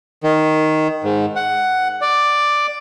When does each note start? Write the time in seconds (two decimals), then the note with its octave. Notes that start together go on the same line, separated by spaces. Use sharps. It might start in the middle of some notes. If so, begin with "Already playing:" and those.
0.23 D#3
1.04 G#2
1.36 F#5
2.01 D5